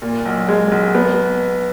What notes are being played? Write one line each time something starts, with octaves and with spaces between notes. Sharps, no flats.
A#2
B1
G#3
B1
B3